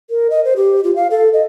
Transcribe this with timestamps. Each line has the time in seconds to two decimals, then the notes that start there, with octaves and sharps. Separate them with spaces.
0.10 A#4
0.30 D#5
0.45 C5
0.56 G4
0.84 F4
0.96 F5
1.11 A4
1.33 D#5